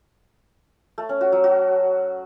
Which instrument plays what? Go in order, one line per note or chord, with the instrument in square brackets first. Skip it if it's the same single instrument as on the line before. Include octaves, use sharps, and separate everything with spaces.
[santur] A3
C#4
F#4
F#3
F#4